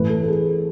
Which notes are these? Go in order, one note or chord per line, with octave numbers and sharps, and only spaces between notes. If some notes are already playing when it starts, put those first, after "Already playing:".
Already playing: A1 A2 E3 B4
A4
A4
G#4